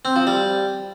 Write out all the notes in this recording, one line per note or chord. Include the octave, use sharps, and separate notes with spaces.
C4
F3
G3